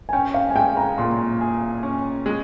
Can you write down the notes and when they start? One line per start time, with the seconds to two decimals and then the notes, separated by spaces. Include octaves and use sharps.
0.09 G#5
0.13 C#4 G5
0.34 F5
0.50 G#5
0.55 G#3 G5
0.77 A#5
0.98 A#2 C6
1.41 G#4
1.83 C#4
2.26 G#3